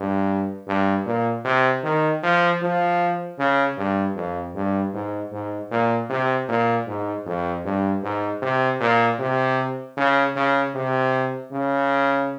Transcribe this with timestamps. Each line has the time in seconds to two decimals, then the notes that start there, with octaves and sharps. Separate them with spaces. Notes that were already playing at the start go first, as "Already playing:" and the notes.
Already playing: G2
0.67 G2
1.06 A#2
1.44 C3
1.83 D#3
2.23 F3
2.62 F3
3.38 C#3
3.77 G2
4.16 F2
4.55 G2
4.94 G#2
5.32 G#2
5.71 A#2
6.10 C3
6.48 A#2
6.87 G#2
7.26 F2
7.65 G2
8.03 G#2
8.42 C3
8.80 A#2
9.19 C3
9.97 C#3
10.35 C#3
10.74 C3
11.52 C#3